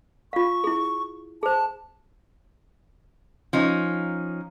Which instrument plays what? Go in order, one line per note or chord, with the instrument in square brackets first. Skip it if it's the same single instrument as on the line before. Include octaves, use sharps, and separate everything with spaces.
[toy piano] F4 F5 [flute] C#6
[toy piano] E4 G#4
[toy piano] G#4 C5 [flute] A5
[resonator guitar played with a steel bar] F3 C#4 D#4